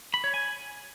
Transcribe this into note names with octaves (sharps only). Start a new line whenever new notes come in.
B5
C#5
G#5